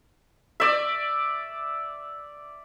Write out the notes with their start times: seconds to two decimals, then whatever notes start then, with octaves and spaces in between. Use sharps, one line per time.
0.60 D5 E5